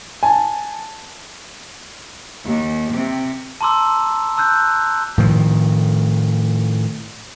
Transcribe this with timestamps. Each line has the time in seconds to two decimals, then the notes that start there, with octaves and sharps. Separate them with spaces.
0.23 G#5 A5
2.44 D#2
2.93 C3
3.61 A5 A#5 C6 D6 E6
4.37 A5 E6 F#6 G6
5.18 A2 D#3 F3